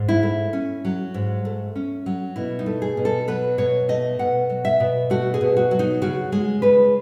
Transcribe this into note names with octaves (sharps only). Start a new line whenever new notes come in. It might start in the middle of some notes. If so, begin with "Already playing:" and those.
Already playing: G#2
E4
A3
C#4
F#3
G#2
A3
C#4
F#3
B2 E4
D#4
A3
G#4
B2
A4
F#3 B4
B2 C#5
A3 D#5
B2 F#5
F#3
E5
B2
A3 F#4
G#4
B2
F#4
F#3
D#4
C#3 F#4
G#3 G#4
C#3 B4